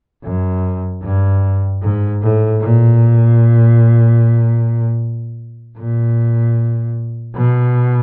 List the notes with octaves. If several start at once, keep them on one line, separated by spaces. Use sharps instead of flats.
F#2
G2
G#2
A2
A#2
A#2
B2